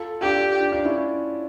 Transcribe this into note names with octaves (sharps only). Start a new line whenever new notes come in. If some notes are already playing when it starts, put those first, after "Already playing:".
Already playing: F4 A4
D4 F4 G4
D4 F4
D4 F4
C#4 E4